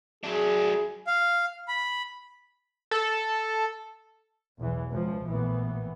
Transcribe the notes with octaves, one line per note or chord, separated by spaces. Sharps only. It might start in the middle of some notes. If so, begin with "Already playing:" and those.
F#3 D4 G#4
F5
B5
A4
B1 E2 E3
C#2 F3
A#1 A2 E3 B3